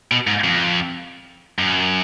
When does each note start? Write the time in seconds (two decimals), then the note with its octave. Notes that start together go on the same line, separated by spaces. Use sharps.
0.12 B2
0.27 G#2
0.44 F2
1.59 F#2